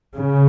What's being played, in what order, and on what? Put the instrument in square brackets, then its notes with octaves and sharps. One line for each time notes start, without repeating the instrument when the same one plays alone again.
[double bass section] C#3